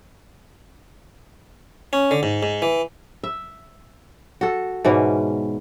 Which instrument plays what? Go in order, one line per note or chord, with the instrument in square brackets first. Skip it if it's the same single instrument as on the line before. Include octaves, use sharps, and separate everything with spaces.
[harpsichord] C#4
D3
G#2
G#2
E3
[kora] E5
F#4 A4
G#2 B2 E3 C#4